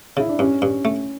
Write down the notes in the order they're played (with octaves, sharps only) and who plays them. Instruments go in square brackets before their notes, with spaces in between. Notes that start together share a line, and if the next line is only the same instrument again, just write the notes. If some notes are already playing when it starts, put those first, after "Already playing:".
[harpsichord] C#3 [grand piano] E4
[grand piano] D4
[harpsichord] G2 [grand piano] C#4
[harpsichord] G2
A3